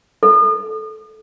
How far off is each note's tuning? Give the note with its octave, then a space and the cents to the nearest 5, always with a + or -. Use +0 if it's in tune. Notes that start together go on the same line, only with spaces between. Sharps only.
A4 -20